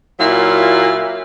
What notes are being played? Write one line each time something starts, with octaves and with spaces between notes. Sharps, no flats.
A#2 F#3 A#3 E4 F4